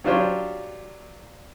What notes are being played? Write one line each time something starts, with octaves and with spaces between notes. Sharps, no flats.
F#3 D4 F4 G4 C5 C#5